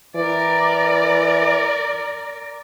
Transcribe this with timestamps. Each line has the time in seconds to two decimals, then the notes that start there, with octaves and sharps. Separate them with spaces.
0.16 E3 A#4 D5